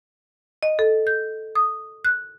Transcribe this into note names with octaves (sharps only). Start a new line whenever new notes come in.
D#5
A4
G6
D#6
F#6